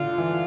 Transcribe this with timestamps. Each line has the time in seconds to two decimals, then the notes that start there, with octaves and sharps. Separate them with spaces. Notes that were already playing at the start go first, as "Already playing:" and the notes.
Already playing: D3 F4
0.18 E3